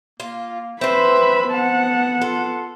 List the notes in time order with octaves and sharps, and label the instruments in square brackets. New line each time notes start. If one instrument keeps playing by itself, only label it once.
[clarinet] A#3 [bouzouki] F4
[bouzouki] C4 C5 [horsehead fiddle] B4 B5 [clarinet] E5
[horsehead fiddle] B3 F#5 [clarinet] A5
[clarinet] F4 [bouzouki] A4